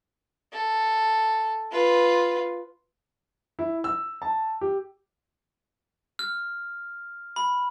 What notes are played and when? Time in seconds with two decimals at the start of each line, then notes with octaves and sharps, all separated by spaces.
0.53 A4
1.72 F4 B4
3.59 E4
3.84 E6
4.22 A5
4.61 G4
6.19 F6
7.36 B5